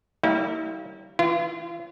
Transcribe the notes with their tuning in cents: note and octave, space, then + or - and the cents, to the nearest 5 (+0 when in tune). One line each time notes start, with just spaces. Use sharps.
G3 -20 A#3 -25 E4 -40
E3 +0 F4 -40